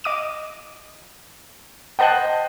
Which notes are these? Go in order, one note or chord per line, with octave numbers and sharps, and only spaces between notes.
D#5 D6 D#7
C5 D#5 F#5 G5 A5 F#6